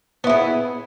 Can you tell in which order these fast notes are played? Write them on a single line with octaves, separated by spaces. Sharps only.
B3 E4 G#4